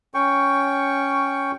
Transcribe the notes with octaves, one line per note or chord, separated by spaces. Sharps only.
C#4 G5 C#6